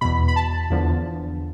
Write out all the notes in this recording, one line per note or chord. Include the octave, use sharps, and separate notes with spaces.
E2 B2 B5
B5
A5
E2 D3 F3